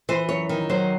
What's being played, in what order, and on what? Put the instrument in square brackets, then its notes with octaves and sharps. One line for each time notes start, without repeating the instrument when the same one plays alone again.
[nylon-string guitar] E3 C5
F#2 C#5
D#3
F#3 C5